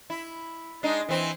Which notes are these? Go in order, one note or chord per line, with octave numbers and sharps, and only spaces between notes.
E4
G#3 D4 D#4
E3 C4